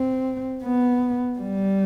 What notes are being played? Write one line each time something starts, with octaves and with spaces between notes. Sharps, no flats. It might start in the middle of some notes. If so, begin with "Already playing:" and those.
Already playing: C4
B3
G3